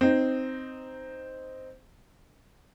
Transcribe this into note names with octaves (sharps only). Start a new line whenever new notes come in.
C4 D#4